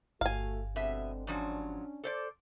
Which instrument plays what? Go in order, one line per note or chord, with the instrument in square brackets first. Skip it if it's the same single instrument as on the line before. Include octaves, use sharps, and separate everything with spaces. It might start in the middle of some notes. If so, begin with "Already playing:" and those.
[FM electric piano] G1 [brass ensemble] A3 F#4 [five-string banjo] F5 G#5
[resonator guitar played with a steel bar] B2 E5 [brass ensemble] D3 G#3 C4
[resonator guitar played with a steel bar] G#2 F3 F#3 [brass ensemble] C#4 D4
[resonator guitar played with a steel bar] A4 C5 D5